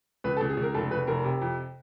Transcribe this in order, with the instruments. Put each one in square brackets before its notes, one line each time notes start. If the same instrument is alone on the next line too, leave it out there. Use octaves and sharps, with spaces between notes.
[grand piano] C#2 B4
A4
C#2
G#4
C#2
A#4
F1 A4
F1 B4
F1 A#4
C3
F2